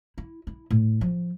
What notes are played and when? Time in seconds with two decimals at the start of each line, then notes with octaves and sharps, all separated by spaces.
0.18 E4
0.47 E4
0.70 A2
1.01 F3